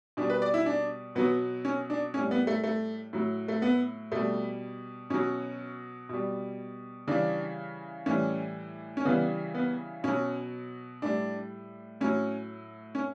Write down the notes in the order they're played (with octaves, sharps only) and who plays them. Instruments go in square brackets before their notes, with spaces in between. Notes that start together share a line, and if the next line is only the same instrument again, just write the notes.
[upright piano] B2 G3 D4
B4
D5
E4
D4
B2 F#3 B3
C#4
D4
A2 G3 C#4
B3
A3
A3
A2 F#3
A3
B3
B2 G3 A3
B2 F#3 C#4
B2 G3
C#3 E3 G3 D4
A2 E3 G3 C#4
C#4
C#3 E3 G3 B3
B3
B2 F#3 C#4
A2 G3 D4
A2 F#3 C#4
C#4